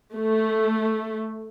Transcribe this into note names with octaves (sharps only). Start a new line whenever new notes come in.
A3